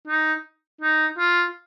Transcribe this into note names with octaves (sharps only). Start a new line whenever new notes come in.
D#4
D#4
F4